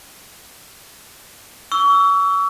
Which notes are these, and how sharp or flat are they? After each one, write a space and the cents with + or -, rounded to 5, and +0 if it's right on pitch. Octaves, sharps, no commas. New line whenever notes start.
C#6 +35 E6 +0